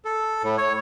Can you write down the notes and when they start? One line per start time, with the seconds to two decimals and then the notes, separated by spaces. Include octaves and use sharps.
0.05 A4
0.43 A2
0.58 C#5